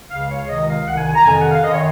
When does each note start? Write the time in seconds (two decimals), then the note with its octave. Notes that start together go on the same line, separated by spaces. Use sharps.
0.10 C#2 C#3 F5
0.30 C#5
0.48 C#2 C3 D#3 D#5
0.68 F5
0.87 C2 C3 D#3 F#5
0.96 G#5
1.06 G#5
1.15 A#5
1.25 F2 C3 D#3 G#5
1.38 F#5
1.51 F5
1.63 F#2 D#3 D#5
1.73 C#5